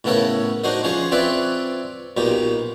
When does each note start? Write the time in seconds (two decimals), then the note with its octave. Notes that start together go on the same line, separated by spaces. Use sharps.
0.04 A2 C#3 B3 A4 A#4 C#5
0.64 D4 D#4 F#4 C5 D#5
0.83 F3 C#4 G#4 C5 C#6
1.12 C4 F4 B4 C#5 D5 E5
2.17 B1 A#2 D#4 G4